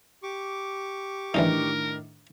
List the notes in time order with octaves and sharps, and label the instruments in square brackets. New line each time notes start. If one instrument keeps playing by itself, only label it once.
[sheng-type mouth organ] G4 C#6 D6
[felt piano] A2 D#3 D4 [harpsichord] E3 G3 D#4 [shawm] A#4